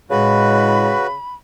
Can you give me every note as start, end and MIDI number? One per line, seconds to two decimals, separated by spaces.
0.11 0.94 45
0.11 1.15 49
0.11 0.94 56
0.11 1.07 66
0.11 1.07 71
0.11 1.35 83